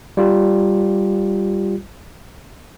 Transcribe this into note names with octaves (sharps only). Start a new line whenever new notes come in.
G3 F4 G4